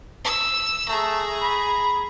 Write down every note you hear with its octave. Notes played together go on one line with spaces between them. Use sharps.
E6
A3 G#4 A#5
B5